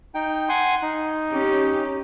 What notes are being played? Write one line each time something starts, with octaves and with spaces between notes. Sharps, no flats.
D#4 G5
F#5 G#5 C6
D#4
C#4 G4